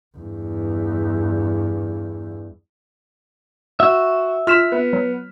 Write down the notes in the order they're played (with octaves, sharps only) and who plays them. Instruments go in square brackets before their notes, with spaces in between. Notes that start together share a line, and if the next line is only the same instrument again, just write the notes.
[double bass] E2 G2
[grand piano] F#4 [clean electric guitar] E5
[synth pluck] F4 [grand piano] F6 B6 E7
[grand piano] B3
[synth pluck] F#3